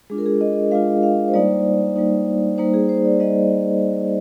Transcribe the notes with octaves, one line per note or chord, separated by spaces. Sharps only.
G#3 D4 F4 G#4
A#4
G#4
D#5
G#3 D4 F4 F5
F5
C5
G3 A#3 D#4 D5
G3 A#3 D#4
G3 A#3 D#4 C5
G#4
C5
D5
G3 A#3 D#4 D#5